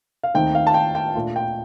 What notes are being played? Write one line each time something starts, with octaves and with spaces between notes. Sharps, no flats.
F5
D#2 D#3 A3 C4 D#4 G5
F5
A5
G5
G5
A#2 A3 D4 F4
G5